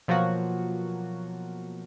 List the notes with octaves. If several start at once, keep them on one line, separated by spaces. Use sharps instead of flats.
B2 F3 F#3 A#3 F4 F#4